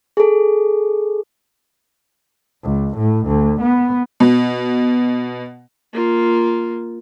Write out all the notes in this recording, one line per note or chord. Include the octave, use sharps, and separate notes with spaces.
G#4 A4
C#2
A2
D2
B3
B2
A#3 F4